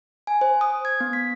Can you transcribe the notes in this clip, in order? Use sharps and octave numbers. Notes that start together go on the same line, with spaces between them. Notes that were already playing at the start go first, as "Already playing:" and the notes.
G#5
C5
D#6
G#6
B3
B6